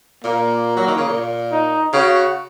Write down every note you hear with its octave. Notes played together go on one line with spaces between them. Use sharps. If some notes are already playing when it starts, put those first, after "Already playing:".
A#2 A#3
F#3
D#3
C#3
A#2
D#4
C#3 F#4